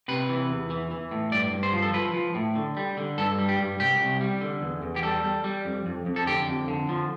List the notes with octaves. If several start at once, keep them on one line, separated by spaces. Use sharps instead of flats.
C3 B4
E3
E2
E3
E3
A2
G2 D5
G2
C5
F3
A4
F3 B4
F3
A2
D3
G3
D3
G2 A4
G3
G4
G2
C2 G4
C2
G3
D3
E2
E2
G4
G3 A4
G3
G3
F2
F2
F2
A4
D3 G4
F2
D3
F3